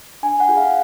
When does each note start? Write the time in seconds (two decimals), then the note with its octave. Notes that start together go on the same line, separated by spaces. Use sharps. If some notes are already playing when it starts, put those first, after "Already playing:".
0.23 D4 G#5
0.40 F#5
0.49 F4 G#4
0.57 F5